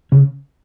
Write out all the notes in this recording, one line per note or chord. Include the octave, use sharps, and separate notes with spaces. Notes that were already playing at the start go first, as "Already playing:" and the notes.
C#3 C#4